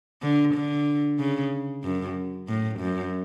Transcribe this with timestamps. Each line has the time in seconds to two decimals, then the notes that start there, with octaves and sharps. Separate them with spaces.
0.22 D3
0.54 D3
1.19 C#3
1.84 F#2
2.48 A2
2.79 F#2